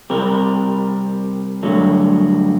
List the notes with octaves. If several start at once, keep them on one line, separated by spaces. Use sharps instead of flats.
C3 G3 C4 G4 A#4
G2 D3 F#3 A3